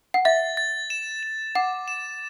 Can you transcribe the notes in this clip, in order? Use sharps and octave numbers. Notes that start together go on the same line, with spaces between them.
F#5
E5 A6
A6
E7
E7
F#5 D6
E7